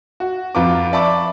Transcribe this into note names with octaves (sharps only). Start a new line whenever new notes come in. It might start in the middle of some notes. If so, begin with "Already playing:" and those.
F#4
F2 F4 B4 A#5 D6
D5 E5 A5 B5 C#6 D6